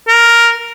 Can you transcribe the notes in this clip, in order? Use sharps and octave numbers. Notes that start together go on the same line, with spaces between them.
A#4